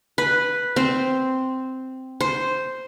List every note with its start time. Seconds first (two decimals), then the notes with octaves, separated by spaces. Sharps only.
0.18 B4
0.76 C4
2.21 C5